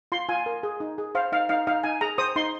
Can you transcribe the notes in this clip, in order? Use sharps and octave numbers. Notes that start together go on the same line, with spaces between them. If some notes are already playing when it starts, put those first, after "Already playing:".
F4 C6
F4 G#5
A#4
G#4
D#4
G#4
C5 F5
D#4 F5
D#4 F5
D#4 F5
D#4 G#5
G#4 A#5
C5 D#6
D#4 C6